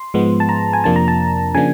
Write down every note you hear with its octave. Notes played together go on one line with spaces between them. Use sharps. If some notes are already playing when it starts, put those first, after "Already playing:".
Already playing: C6
G#2 F3 G#3 B3
A5
A#5
G#5
F2 C3 F3 A#3 D4 A5
A#5
A5
C#3 F3 A#3 D4 G#5